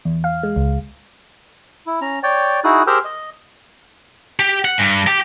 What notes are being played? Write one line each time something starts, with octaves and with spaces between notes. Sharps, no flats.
E2
F5
G#3
C#2
E4
C#4 A#5
C#5 D5 G5
D#4 E4 F#4 G#4 D#6 F#6
G4 G#4 A#4 C5 G5 E6
D#5
G4
F#5
G2
G4